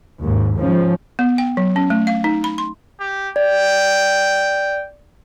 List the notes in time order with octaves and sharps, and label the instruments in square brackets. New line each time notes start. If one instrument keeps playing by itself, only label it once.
[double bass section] D#2 G#2
G#2 F3 C#4
[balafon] B3
G5
F#3
C#4
A3
F5
D#4
B5
C6
[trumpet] G4
[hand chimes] D5 [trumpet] G5